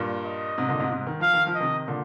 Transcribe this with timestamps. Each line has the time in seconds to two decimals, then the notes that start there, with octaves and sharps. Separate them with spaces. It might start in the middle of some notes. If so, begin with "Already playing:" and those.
Already playing: G2 A#2
0.26 D#5
0.58 G#2 C3
0.68 A#2 D3
0.79 G#2 C3
0.90 G#2 C3
1.07 D#3
1.20 F3 F5
1.33 D#3
1.47 F3
1.55 D#5
1.60 C3 D#3
1.88 A#2 D3